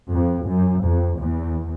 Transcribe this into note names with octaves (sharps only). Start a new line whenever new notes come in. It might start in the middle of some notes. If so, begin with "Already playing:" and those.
F2
F#2
F2
E2